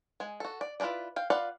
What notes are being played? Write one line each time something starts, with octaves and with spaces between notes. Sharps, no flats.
G#3 G#5
F#4 A4
D5
E4 F4 A4 B4 D5
F5 G5
F4 B4 D5 F5 F#5